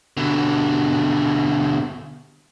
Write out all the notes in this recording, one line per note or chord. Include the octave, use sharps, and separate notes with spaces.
B2 D3